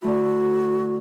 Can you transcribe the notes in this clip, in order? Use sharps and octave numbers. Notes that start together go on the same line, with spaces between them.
D3 A3 E4 F#4